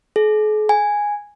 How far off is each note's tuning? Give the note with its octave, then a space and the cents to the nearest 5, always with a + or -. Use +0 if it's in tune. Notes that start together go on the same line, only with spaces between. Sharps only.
G#4 +45
G#5 -5